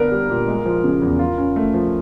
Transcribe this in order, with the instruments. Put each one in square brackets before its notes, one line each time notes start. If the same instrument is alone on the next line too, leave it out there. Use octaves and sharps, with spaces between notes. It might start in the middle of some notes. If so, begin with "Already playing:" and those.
Already playing: [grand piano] D3 B3 D4 [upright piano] A#4
[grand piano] G3
A#2
G#3
F3
C#3
E2
F4
C#4
A3
F3